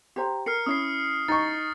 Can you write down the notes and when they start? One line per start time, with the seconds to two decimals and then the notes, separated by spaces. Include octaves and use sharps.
0.16 G4 C5 A#5
0.46 A#4 F6 C7 C#7
0.66 C#4 E4 D#6 C7
1.28 D#4 C#6 A6